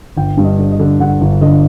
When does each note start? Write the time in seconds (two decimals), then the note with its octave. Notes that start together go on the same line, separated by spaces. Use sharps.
0.17 G1 G5
0.37 G2
0.44 D#5
0.59 D3
0.72 D#5
0.79 D3
1.00 D3 F#5
1.21 G1
1.41 D3 D#5